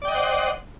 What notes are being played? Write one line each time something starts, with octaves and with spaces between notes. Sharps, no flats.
C5 D5 D#5 F#5 G5